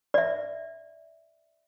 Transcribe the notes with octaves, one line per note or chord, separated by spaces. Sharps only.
D5 E5